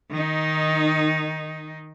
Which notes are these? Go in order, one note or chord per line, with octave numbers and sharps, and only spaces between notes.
D#3 D#4